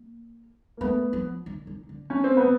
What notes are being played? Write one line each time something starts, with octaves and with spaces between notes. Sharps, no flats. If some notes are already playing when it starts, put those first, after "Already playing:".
Already playing: A#3
A#3
A3 B3
F3
D#3
D#3
D3
D#3 C#4
C4
B3
D3